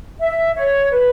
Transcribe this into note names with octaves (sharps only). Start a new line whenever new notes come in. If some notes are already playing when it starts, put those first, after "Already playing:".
E5
C#5
B4